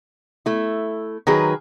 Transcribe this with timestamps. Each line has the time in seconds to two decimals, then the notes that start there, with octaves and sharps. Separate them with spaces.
0.46 A3 E4
1.27 D#3 F#3 G#4 B4